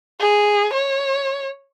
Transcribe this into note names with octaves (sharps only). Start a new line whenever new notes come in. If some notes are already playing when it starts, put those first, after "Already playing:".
G#4
C#5